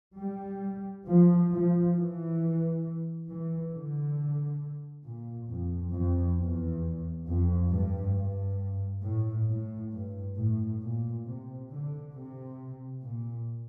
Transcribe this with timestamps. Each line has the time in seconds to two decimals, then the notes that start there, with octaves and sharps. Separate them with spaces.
0.18 G3
1.07 F3
1.51 F3
1.95 E3
3.29 E3
3.73 D3
5.05 A#2
5.49 F2
5.93 F2
6.39 E2
7.26 F2
7.71 G2
8.15 G2
9.03 A2
9.49 A2
9.93 G2
10.37 A2
10.81 A#2
11.25 C3
11.70 D3
12.14 C3
13.02 A#2